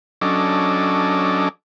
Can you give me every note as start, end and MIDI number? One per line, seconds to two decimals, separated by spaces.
0.21 1.49 54
0.21 1.49 61
0.21 1.49 62
0.21 1.49 69
0.21 1.49 75
0.21 1.49 86